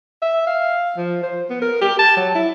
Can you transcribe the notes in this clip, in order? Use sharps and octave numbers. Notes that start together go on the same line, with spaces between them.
E5
F5
F3
C5
B3
A#4
G4
A5
F#3
E4